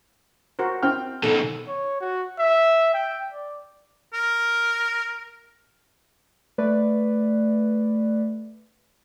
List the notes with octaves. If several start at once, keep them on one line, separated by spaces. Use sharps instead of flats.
F#4 A#4 C5
C4 G5 F6
B2 D#3 A4
C#5
F#4
E5
G5
D5
A#4
A3 B4 D5